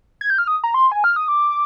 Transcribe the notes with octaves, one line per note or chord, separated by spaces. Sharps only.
G#6
G6
F6
D#6
A#5
C6
G#5
F6
D#6
D6